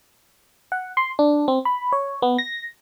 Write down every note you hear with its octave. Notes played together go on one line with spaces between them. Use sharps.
F#5
C6
D4
C4
B5
C#5
B3
A#6